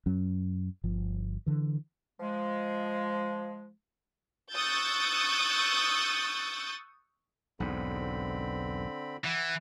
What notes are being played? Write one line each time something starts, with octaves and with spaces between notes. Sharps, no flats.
F#2 F#3 C#4
G1 F3
D3 E3
F3 G#3
C#6 D#6 E6 F#6 G6 A6
B1 E2 G#2 D3 C4 B5
E3 F#5